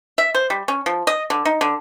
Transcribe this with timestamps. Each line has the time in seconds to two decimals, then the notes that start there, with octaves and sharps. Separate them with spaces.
0.18 E5
0.35 C5
0.50 G3
0.68 C#4
0.86 F3
1.07 D#5
1.30 D3
1.45 D#4
1.61 D3